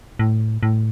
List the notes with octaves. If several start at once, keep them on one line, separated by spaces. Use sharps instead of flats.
A2
A2